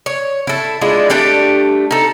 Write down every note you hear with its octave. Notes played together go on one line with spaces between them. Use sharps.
C#5
E4 A4
G#3 D4 E4 F4
A3 D4 G4 G5
D#4 A4